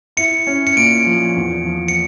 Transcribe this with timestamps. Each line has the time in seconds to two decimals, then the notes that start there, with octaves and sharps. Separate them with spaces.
0.17 E4 C#7
0.47 C#4
0.67 C#7
0.77 A#2 D7
1.06 F3
1.36 E2
1.65 F3
1.88 C#7